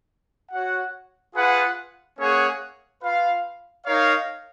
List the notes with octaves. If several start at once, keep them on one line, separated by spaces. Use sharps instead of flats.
F#4 C#5 F#5
F4 G#4 B4 F#5
A#3 C#4 G#4 C#5 F#5
F4 B4 F5
D#4 A#4 C#5 F5